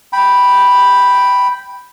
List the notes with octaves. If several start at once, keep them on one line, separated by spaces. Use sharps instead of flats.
G5 B5